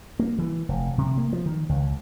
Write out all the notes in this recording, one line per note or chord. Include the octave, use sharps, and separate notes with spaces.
A#3
E3
F1
C3
A#3
F3
D#3
C#2